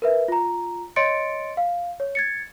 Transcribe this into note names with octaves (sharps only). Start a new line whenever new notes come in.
A#4 B4 E5
F4 A#5
C#5 D#5 C6 A6 C#7 D7
F5
C#5
G#6 A6 C#7